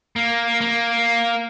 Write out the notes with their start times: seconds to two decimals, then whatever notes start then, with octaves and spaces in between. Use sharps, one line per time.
0.16 A#3
0.61 A#3